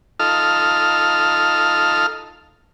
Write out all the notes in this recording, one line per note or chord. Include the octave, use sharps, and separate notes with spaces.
D#4 F4 A4 F6